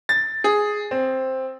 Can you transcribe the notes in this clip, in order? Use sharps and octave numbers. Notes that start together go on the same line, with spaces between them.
A6
G#4
C4